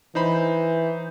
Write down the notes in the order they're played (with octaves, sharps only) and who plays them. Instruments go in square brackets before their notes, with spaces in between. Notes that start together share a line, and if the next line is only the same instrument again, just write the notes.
[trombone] E3 [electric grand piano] D#4 C5 B5